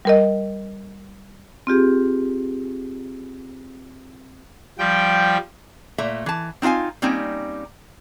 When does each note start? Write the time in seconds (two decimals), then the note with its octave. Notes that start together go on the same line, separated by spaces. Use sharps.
0.05 G3 A#4 D#5
1.67 C4 F4 G4 G#4
4.78 F3 G3 G5
5.98 A#2 A3 E5 A#5
6.26 E3 A5
6.62 C4 D#4 F4 F5 G#5
7.02 G3 A#3 C4 C#4 D#4